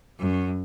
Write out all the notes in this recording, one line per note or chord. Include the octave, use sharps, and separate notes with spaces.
F#2